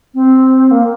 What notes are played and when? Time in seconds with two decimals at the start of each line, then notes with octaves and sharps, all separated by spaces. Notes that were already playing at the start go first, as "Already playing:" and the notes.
0.14 C4
0.71 A#3